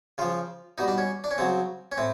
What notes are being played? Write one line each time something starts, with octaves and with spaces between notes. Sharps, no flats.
C#3 F3 F4
B2 G3 D#4
D4
C#4
D4
C#4
C#3 F#3 C4
C#4
A2 C4